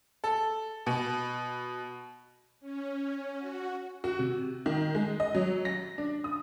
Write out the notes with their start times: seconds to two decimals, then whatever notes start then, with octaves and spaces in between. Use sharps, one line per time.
0.24 A4
0.86 B2
2.60 C#4
3.37 F#4
4.04 F#4
4.19 C3
4.66 D#3
4.95 G#3
5.20 D#5
5.34 F#3
5.65 A#6
5.98 D4
6.24 D#6